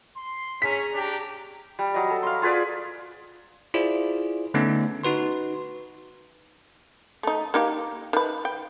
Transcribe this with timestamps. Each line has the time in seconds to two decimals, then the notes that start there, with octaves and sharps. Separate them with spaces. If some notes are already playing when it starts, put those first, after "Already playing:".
0.16 C6
0.62 C#4 G#4 A#5 B6
0.94 D4 G4
1.79 G3
1.94 F#3 D#5
2.10 A4
2.23 F5 C6
2.42 F4 G#4 B4 D5
3.74 E4 F4 G#4 C5 D5
4.54 D3 A3 B3 C#4 D#4
5.04 D#4 F#4 B4 C6
7.23 A3 D#4
7.54 A#3 D#4 G4
8.13 D#3 B4
8.45 G5